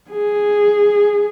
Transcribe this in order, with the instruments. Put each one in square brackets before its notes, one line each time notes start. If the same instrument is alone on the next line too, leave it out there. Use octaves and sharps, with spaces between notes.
[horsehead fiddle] G#4